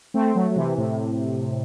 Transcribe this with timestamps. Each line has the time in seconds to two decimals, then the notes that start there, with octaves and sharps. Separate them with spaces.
0.14 A3 C4
0.35 F#3 A3
0.51 F#3
0.56 C3 E3
0.77 A2 C3